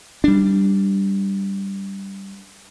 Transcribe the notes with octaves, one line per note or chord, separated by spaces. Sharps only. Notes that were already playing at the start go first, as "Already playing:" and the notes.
G3 D4